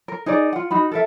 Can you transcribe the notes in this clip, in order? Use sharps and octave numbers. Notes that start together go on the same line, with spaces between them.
A#4
D#4 G#4 A#4 D5
F4 F#5
D#4 F#4 B5
A4 A#4 E5